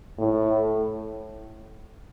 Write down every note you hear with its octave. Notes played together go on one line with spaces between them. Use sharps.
A2